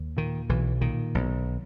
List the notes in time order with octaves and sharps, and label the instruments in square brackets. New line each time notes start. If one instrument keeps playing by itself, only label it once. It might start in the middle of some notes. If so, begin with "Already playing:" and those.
Already playing: [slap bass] D#2
A#2 D#3
B1 E3
A#2 D#3
B1